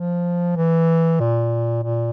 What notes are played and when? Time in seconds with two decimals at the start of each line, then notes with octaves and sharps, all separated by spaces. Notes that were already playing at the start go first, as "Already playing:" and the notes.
Already playing: F3
0.57 E3
1.20 A#2
1.84 A#2